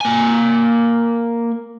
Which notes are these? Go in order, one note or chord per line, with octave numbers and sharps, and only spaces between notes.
A#3 G#5